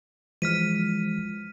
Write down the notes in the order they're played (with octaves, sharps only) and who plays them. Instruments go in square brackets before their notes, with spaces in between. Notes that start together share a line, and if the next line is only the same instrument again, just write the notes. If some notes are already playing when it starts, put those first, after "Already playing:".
[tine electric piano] E3 F3 G#3 [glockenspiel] F6 B6 D#7